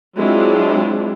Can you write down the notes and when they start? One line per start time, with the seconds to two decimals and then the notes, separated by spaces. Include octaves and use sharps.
0.16 F#3 G#3 C4 D4 E4 F4